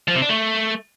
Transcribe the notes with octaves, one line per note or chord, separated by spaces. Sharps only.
F3
C3
D4
A3